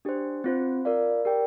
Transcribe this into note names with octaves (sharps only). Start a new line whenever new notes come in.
D4 G4 C5
C4 F4 C5
F4 A#4 D5 F5
G4 A#4 D5 G5